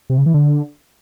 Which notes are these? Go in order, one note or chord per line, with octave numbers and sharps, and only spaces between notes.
C3
C#3
E3
D3